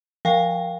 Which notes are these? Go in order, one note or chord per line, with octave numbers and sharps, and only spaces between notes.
F3 F5 G5